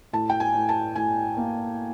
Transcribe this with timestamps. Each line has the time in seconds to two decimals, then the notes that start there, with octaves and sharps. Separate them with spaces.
0.13 A2 A5
0.30 G5
0.40 G#5
0.55 A2
0.69 A5
0.96 A2 G#5
1.37 A#3